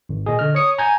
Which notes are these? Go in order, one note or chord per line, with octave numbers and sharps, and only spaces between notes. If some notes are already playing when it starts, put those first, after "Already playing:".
G#1
A#2 G#4 D#5
D3 F6
C#5 D#6 C#7
G#5 A#5 G6 G#6